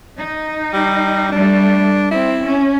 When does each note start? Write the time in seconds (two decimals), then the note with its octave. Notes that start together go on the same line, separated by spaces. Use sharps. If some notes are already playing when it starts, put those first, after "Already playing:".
0.16 D#4
0.73 G3
1.32 G3 A3 D4
2.11 C4 E4
2.44 C#4